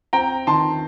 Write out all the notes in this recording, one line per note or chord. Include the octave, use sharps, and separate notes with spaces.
C4 G5 A#5
D#3 A5 C6